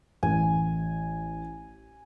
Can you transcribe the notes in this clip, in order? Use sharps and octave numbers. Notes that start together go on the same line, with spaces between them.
A1 G#5